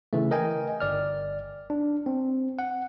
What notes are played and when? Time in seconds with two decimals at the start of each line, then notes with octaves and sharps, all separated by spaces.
0.13 C#3 E3 A3
0.31 A#4 D#5 G5 G#5
0.80 G1 D5 F6
1.70 D4
2.06 C4
2.59 F#5